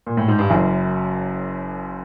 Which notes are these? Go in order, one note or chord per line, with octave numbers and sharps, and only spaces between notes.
A#2
A2
G#2
G2
F#1 F#2